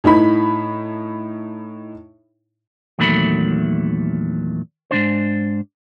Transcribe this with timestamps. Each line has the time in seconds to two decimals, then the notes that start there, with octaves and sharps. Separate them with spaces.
0.04 A2 D#4 E4 B5
2.99 E2 A#2 D#3 F#3 A3 B5
4.91 G#2 B2 D4 C5